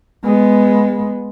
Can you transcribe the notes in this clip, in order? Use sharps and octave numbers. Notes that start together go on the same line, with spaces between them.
G#3 B3